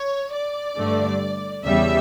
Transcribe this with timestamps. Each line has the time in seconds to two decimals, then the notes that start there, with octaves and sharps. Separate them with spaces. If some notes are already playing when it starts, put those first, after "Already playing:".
Already playing: C#5
0.34 D5
0.77 G2 D3 A3
1.65 E2 C#3 G3 E5